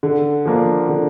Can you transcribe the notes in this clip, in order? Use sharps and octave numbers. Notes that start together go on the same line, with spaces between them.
D3
F3 A#3 D4
D3